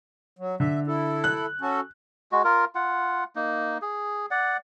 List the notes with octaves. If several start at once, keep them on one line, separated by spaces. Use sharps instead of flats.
F#3
D3 E5
E4 A4
F#6
C#4 F#4 A4
G#3 F#4
F4 A#4
F4 F#5
A#3 D#4
G#4
D5 F#5